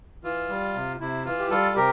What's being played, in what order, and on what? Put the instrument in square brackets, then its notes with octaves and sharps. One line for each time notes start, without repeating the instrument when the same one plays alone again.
[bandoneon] E3 F4
G3
C3
C3 E4
E3 F4
G4
G3 F4 A4
C3 G4 A#4